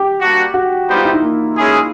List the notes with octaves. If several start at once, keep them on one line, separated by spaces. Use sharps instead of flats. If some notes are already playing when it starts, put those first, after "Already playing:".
Already playing: G4
G3 A#3 D4 F#4
F#4
G3 B3 D#4 G4 C5
F4
E4
D#4
A#3
G#3 C#4 E4 G#4